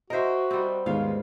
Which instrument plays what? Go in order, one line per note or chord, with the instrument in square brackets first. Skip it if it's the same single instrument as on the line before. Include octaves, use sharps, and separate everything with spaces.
[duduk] F#4 [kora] A#4 C5 [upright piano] D#5 E5
[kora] G3 C4
[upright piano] D#2 B3 F4 [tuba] G#2 [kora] F5